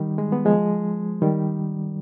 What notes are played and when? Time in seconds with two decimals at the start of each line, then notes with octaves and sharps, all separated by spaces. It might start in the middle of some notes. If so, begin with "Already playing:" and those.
Already playing: D#3 G3
0.18 G#3
0.32 B3
0.45 F3 G#3
1.22 D#3 G3